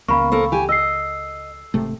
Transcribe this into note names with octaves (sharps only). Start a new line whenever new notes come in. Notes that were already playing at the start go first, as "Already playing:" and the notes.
C#2 A#3 F5 B5 C#6
A#3 A4 C5
G4 G#5
D#5 E6 C7
G#1 C3 A3